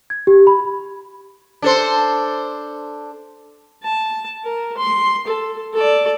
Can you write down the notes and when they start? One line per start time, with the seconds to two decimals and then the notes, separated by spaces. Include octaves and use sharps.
0.10 G#6
0.27 G4
0.47 B5
1.62 D4 A4 C5
3.83 A5
4.44 A#4
4.77 C6
5.27 A4
5.74 A4 D5